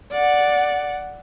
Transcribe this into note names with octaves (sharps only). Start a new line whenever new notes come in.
D5 F#5